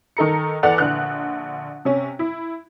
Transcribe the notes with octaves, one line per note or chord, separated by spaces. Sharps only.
D#3 D#4 A4 A#5 C#7
E2 A4 D5 F#5 F#6 F7
A#1 D3 F#6
C3 C#4
E4